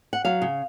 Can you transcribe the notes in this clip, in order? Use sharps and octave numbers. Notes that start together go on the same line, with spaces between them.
F#5
F#3 F5
C#3